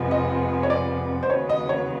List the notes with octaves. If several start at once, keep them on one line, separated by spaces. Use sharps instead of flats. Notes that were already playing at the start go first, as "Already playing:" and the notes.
Already playing: F2 C3 F3 G#3 B3
D#5
C#5
D5
C5
D#2 C#3 F#3 B3 C#5
D#5
C#5